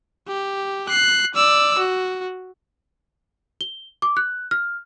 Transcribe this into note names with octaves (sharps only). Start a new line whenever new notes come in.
G4
F#6 C7
D5 E6
F#4
G7
D6
F#6
F6